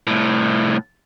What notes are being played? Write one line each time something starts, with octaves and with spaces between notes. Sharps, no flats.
C2 A2